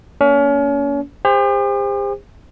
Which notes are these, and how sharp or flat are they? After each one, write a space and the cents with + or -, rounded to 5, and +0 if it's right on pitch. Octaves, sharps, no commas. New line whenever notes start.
A#3 +0 C#4 +35
G4 +45 C5 +0